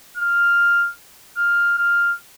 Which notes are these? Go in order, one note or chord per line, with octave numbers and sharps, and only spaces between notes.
F6
F6
F6